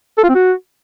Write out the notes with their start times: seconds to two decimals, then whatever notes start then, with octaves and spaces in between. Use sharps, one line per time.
0.18 A4
0.24 F4
0.29 C4
0.35 F#4